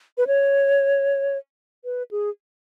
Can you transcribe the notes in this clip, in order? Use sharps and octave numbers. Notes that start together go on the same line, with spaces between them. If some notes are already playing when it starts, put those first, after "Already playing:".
B4
C#5
B4
G#4